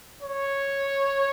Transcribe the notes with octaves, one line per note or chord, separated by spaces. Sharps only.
C#5